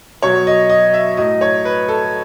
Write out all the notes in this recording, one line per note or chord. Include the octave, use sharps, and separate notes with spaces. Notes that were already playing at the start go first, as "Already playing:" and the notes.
B2 F#3 C#5
D#5
D#5
E5
A2 F#3 D#5
C#5
B4
A4